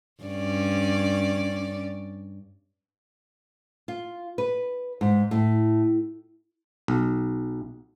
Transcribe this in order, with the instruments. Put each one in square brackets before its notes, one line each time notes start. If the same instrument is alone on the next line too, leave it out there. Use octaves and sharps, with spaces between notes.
[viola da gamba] G2 C#4 D5
[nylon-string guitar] F4
B4
G#2
A2
[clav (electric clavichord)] B1